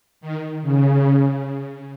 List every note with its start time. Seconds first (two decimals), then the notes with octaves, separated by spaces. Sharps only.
0.21 D#3
0.62 C#3